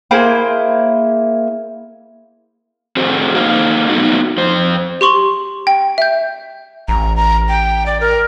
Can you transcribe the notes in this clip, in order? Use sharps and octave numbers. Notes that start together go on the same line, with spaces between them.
A#3 E4 G#4 C5
C4 F#4 G#4 A4 C5
A#3 D#4 A4 C5 F5
A3 B3 D#4 F#4
F2 C5
G4 C6 C#6 F#7
G5
E5 G6
A1 A#5
A#5
G5
D5
A#4